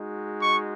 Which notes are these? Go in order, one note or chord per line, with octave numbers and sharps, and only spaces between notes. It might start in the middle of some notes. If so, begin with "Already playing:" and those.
Already playing: G#3 D#4 F#4
C#6